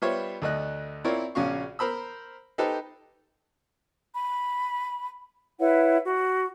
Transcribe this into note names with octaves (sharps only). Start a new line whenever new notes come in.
G3 B3 F4 C5 C#5 E5
D2 A3 D#5 F#6
C4 E4 F4 A#4 C#5 D5
A#1 C#3 C#4 F#4 F5 C#6
A#4 C5 B5 E6
D#4 G4 A4 B4 C5
B5
E4 B4 C#5 F#5
F#4